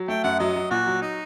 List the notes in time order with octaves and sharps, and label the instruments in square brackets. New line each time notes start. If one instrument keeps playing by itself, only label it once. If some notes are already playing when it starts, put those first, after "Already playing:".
Already playing: [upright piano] F#3
[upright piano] A3 [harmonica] G5
[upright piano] F#2 [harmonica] F#5
[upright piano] F#3 [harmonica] D#5
[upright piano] F#3
[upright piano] A#2 [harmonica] F#4
[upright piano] F#3
[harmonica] D#4